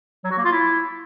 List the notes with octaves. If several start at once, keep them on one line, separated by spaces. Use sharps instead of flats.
F#3
F#4
A#3
F4
E4